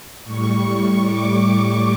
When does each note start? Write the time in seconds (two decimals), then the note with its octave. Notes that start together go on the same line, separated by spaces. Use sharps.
0.25 A2 G3 C#6
1.03 D6